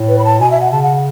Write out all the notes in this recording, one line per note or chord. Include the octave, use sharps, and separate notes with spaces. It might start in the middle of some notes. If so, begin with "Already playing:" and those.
Already playing: A2
B4
B5
A5
B2 G#5
E5
F#5
C#3 A5
F#5